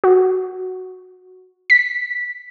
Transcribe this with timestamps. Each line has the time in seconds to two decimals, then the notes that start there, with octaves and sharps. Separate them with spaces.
0.04 F#4
1.70 B6